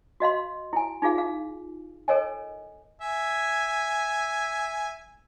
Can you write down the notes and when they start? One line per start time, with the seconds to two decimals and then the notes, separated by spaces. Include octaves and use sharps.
0.20 F#4 D#5 F5 C6
0.73 E4 G#5
1.02 D#4 F4 G#4 F5
1.18 F5
2.08 A4 A#4 C#5 D#5 G#5
3.01 E5 G#5